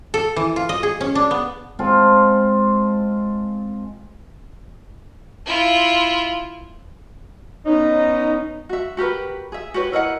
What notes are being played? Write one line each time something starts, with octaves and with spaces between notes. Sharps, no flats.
A4
E3
F4
D#5
G#4
C#4
D4
B3
G#3 C4 F4 A4
E4 F4
B3 C#4 D#4
F#4 E5
F#4 G4 A#4 B4
G#4 E5
F#4 G4 B4 C#5
E4 A#4 D#5 F#5